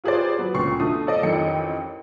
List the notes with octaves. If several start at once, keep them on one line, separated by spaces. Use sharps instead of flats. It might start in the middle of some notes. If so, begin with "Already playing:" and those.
F4 G4 G#4 B4 C5 D5
F#3 B3
G1 C#2 A#2 C#3 C#6 C7
B2 D3 A3 D#6
A4 D5 D#5
A1 F2 D#3 D#4 G5 C#7